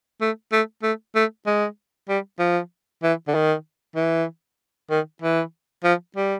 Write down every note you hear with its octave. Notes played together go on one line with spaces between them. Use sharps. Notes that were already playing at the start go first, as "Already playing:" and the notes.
A3
A3
A3
A3
G#3
G3
F3
E3
D3
D#3
E3
D#3
E3
F3
G3